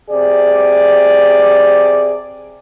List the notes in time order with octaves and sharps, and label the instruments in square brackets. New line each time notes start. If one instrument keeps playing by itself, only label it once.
[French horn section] C3 G#4 D5